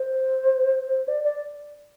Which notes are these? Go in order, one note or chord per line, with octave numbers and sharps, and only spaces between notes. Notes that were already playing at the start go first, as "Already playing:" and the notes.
Already playing: C5
D5
D5